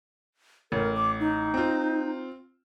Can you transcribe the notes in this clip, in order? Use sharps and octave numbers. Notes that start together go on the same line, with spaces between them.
A1 A#4
D6
D#4
C4 F4